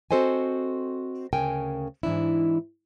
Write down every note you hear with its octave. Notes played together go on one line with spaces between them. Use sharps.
C4 F#4 A4 C5 D#5 G#5
D2 C#3 A#4 G5 G#5
G#2 E3 D4 E4